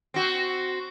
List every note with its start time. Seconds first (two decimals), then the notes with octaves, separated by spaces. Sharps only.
0.14 C4 F#4